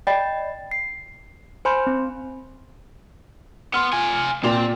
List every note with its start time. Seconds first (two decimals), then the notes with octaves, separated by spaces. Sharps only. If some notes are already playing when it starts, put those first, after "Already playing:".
0.07 D5 D#5 G5 B5 A6
0.71 C7
1.65 C5 G#5 B5 C6 G6
1.87 C4
3.74 B3 C6 F6
3.93 F4 G#5
4.43 A#2 C4 D5 F7